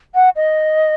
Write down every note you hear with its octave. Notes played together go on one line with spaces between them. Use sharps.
F#5
D#5